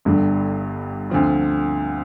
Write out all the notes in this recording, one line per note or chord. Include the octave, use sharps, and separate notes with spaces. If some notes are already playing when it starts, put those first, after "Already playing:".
G1 G2 D3 G3 D4
D2 D3 F3 C4 F4